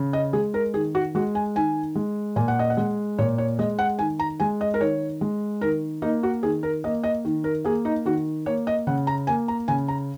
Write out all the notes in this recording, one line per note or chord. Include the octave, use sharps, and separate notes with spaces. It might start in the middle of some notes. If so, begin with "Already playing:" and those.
Already playing: C#3
D#5
G#3 G#4
A#4
D#3 G#4
F#4
G#3 F#4
G#5
D#3 G#5
G#3
A#2 G#5
F#5
D#5
F#5
G#3
A#2 C#5
C#5
G#3 D#5
F#5
D#3 G#5
A#5
G#3 G#5
D#5
A#4
D#3 C#5
G#3
D#3 A#4
A#3 D#4
F#4
D#3 G#4
A#4
A#3 D#5
D#5
D#3
A#4
A#3 G#4
D#4
D#3 F#4
A#3 C#5
D#5
C#3 F#5
A#5
A#3 G#5
A#5
C#3 G#5
A#5